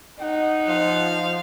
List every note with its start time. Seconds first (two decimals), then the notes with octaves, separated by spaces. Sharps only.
0.21 D#4 F#5
0.68 F3 F5